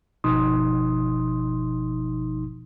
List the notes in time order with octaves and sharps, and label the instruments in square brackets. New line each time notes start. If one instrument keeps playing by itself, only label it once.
[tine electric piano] G1 B2 F3 D#4 C6 D#6